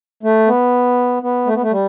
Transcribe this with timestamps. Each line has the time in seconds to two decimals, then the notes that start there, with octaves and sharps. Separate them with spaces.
0.23 A3
0.47 B3
1.23 B3
1.46 A3
1.54 B3
1.62 A3
1.71 G3